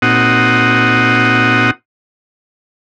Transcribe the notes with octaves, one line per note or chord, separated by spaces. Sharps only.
A#2 C4 D#4 F#4 F#5 D#6